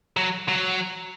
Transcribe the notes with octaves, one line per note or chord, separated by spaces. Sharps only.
F#3
F#3